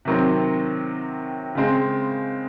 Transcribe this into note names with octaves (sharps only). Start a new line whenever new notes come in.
C3 D#3 F#3 C4
C#3 G#3 C4